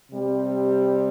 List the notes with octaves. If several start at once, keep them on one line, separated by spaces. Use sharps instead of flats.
C3 G3 C4 G4